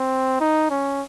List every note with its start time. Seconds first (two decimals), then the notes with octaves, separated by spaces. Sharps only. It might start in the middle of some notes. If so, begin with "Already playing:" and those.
Already playing: C4
0.41 D#4
0.71 C#4